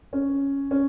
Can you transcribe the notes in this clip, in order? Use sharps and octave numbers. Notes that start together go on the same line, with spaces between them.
C#4
C#4